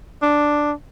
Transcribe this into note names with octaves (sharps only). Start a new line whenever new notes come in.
D4